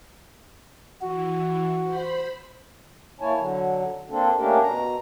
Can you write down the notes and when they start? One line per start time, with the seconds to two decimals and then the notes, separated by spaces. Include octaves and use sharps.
1.02 E3 F#4
1.84 C5 B5
3.20 A#3 E4 C#5 G#5 A5
3.38 D3 F#3
4.10 A#3 C4 D4 A4
4.37 A3 A#3 C#4 D4 G4 A#4
4.62 B2 A#5